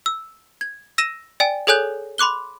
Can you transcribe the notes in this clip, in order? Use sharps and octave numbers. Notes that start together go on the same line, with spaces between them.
E6
G#6
E6 A#6 D#7 E7
D5 G5 G#5
G#4 A4 C#5 G#5 F#6 G6
B5 C6 D6 F#6 G7